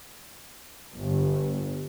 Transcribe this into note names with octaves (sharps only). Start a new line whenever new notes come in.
G1